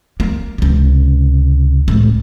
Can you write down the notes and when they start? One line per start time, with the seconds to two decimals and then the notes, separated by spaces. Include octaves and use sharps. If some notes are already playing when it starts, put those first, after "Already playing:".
0.20 A#3
0.58 C#2 C3
1.88 C#2 A2